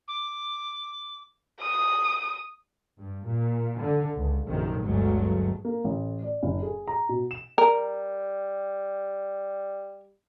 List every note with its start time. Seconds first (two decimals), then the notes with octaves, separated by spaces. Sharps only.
0.08 D6
1.62 D#6
2.98 G2
3.27 A#2
3.80 D3
4.16 C#2
4.47 A#1 F#2 C3 D#3 F#3
4.81 G1 D2 G2 F#3 G#3 A3
5.65 A#3
5.84 A1
6.22 D5
6.43 F#1
6.63 G#4
6.88 A#5
7.09 B2
7.31 E7
7.58 G3 A#4